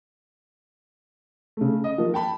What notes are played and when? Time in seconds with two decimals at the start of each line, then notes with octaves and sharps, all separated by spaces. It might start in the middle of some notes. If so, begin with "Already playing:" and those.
1.57 C#3 A3
1.84 D#5
1.98 F3 A#3
2.14 G5 A5 B5